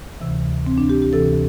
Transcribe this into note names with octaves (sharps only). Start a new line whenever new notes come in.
D2 C3 E3
C4
D4
G4
G4
D2 C3 E3 A4